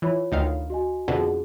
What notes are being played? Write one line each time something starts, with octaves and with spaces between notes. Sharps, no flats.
E3 F4 C#5 B5
D2 D#3 F5
F#4 D#5 G#5
F2 B2 D3 F4 G#4